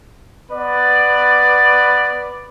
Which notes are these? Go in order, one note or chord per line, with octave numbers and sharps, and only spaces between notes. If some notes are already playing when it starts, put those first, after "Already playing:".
B3 B4 D5